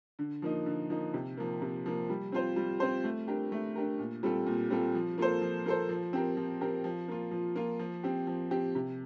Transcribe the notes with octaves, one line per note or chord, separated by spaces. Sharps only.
D3
F3 A#3 D#4
D3
F3 A#3 D#4
C3
F3 A#3
C3
F3 A#3
G3
C4 F4 C5
G3
C4 F4 C5
A3
D4 G4 A#4
A3
D4 G4 A#4
A#2
G3 C4 F4 A4
A#2
G3 C4 F4 A4
F3
A#3 F4 A4 C5
F3
A#3 F4 A4 C5
F3
C4 G4 A#4
F3
C4 G4 A#4
F3
A#3 F4
F3
A#3 F4
F3
C4 G4
F3
C4 G4
C3